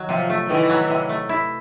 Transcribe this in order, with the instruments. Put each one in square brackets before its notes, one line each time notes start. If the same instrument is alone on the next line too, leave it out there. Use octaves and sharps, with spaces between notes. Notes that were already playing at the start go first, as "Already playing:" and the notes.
Already playing: [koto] D#3 F#3
[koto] C3 [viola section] F3
[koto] A3
[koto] D#3 [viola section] E3
[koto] F#3
C3
A3
E4